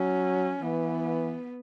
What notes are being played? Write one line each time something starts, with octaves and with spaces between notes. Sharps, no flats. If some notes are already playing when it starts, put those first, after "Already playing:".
Already playing: F#3 C#4
E3 B3